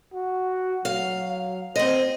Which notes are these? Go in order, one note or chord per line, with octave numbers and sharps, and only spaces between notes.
F#4
F#3 F5
C4 C5 D#5